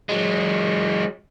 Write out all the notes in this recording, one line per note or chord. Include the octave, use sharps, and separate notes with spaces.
F#3 G#3